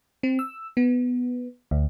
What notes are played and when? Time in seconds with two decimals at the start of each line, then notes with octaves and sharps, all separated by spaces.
0.23 C4
0.39 E6
0.77 B3
1.71 D2